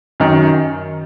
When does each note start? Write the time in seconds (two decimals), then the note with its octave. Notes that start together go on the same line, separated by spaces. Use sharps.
0.20 F#2 D#3